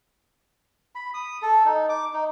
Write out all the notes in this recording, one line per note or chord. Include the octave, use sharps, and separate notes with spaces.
B5
D#6
A4
D#4
D6
D#4